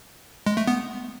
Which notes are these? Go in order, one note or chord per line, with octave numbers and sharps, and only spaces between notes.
G#3
A3
B3